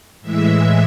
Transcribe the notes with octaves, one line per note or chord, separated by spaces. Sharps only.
A2 E3 G#3 E5